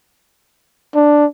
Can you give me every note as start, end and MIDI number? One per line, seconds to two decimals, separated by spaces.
0.95 1.26 62